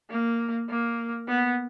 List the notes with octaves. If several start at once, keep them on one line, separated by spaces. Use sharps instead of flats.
A#3
A#3
B3